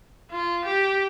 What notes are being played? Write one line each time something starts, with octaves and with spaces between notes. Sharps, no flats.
F4
G4